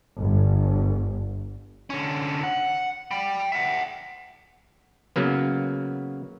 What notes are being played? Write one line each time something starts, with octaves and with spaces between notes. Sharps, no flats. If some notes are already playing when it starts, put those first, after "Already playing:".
G1
D3 C#4
F#5
G5 B5
E5 F#5
C#3 F#3 A#3 B3